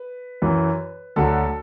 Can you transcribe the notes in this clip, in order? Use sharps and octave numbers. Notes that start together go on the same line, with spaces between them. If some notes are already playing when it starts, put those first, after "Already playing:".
Already playing: B4
F#2 E3
D2 D3 F#3 A4